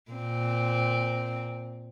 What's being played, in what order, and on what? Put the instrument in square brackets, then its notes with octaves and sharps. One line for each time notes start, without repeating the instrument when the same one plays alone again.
[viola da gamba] A#2 C4